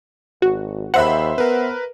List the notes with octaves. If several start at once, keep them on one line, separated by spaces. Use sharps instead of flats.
G#1 F#4
D#2 C5 E5 F#5 B5
B3 A#4 B4